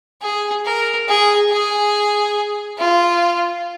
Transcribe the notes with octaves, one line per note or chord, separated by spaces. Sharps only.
G#4
A#4
G#4
G#4
F4